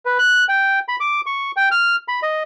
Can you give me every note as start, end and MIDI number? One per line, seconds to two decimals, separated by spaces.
0.05 0.18 71
0.19 0.44 90
0.49 0.79 79
0.88 0.96 83
1.00 1.21 86
1.26 1.51 85
1.56 1.69 79
1.71 1.96 89
2.08 2.20 83
2.23 2.43 75